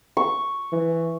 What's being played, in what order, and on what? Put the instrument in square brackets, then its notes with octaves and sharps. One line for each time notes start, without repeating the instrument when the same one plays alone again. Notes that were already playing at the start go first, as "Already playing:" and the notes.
[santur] C#6
[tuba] E3